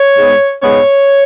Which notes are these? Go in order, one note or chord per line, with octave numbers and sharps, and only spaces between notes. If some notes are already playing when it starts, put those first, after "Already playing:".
Already playing: C#5
G#2 G#3 B3
G#2 G#3 B3 C#5